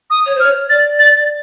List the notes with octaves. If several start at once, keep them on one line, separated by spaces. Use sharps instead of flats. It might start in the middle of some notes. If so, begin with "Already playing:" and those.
D#6
C#5
C5
C#5 F6
D5 A6
A6